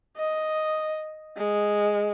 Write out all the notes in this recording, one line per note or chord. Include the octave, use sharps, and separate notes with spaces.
D#5
G#3